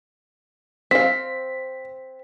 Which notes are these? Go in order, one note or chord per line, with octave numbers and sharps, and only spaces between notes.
C4 F5 B6